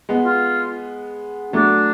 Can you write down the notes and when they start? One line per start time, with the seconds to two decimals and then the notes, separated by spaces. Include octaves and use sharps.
0.09 G#3 B3
0.25 F4
1.53 F#3 A3 D4